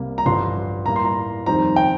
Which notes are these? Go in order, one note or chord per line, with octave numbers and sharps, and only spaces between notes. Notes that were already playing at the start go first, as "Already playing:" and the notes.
Already playing: C2 C3 G3 A#3
A#5
A1 G2 D3 F3 C6
A2 G3 A#3 A#5
C6
A#5
F2 D#3 G3 C4 A#5
G5